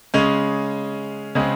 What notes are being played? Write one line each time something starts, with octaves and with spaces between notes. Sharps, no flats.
C#3 G#3 C#4
C#3 G#3 C4